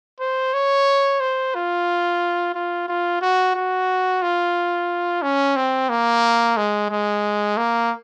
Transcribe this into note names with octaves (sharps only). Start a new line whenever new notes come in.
C5
C#5
C5
F4
F4
F4
F#4
F#4
F4
C#4
C4
A#3
G#3
G#3
A#3